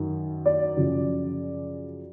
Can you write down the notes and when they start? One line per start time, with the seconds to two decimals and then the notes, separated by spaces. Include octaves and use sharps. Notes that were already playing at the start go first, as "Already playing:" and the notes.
Already playing: F#2 D#3
0.46 D5
0.77 F#2 C#3 F3